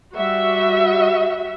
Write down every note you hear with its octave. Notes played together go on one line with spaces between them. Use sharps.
G3 F#4 E5